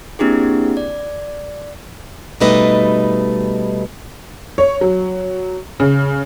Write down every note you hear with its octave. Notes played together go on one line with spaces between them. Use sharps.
A#3 C4 D4 E4 G4 G#4
D5
B2 G3 A3 D#4 B4 D#5
C#5
F#3
C#3